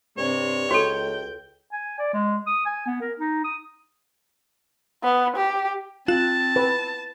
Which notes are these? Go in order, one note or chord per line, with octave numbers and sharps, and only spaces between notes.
G2 C3 C4 C#5
C#2 F#4 A4 G5 G6
G#5
D5
G#3
D#6
G#5
B3
A#4
D#4
D#6
B3
G4
C4 F4 A5 F#6 E7
B4